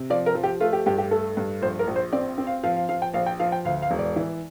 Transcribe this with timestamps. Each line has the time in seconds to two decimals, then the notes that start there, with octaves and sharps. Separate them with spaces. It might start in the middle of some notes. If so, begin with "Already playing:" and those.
Already playing: C3
0.10 F3 D5
0.26 A#4
0.35 F3
0.43 G4
0.60 A3 F4
0.73 G4
0.86 G2 G4
0.98 G4
1.11 A3 A4
1.37 G2
1.62 A#1 C5
1.79 A#4
1.87 A#1
1.96 C5
2.13 C4 D5
2.38 C4
2.47 F5
2.64 F3 F5
2.76 F5
2.89 F3 F5
3.02 G5
3.14 A#1 F5
3.26 G5
3.39 F3 F5
3.52 G5
3.65 D2 F5
3.82 F5
3.91 E1
3.99 D5
4.16 E3